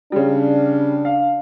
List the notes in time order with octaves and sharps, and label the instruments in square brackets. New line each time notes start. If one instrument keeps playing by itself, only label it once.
[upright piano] C#3 G3 [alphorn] D4
[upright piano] F5